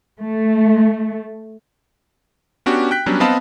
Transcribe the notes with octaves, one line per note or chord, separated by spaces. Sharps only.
A3
B3 C#4 D4 F#4 G4
G5 F#6 B6
F#3 G3 B3 C#4 D4
B3 C4 D#5 F5 A5 B5